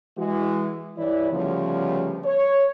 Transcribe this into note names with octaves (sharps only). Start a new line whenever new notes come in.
E3 G#3 F#4
G2 E3 E4 C#5 D5
D2 C#3 F3 G3 B3 C#5
C#5